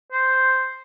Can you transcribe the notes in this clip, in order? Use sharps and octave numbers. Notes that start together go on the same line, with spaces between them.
C5